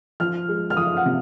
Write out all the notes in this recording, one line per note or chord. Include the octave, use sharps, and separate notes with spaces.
F3 F6
G#3
F6
F3 D#6
F#5
C3